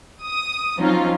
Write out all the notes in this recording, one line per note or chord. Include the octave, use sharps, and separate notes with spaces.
D#6
F3 F#3 C4 C#4 D#4 F4